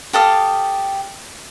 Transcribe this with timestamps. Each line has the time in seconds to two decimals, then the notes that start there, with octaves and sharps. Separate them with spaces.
0.13 G4 A4 F5 D#6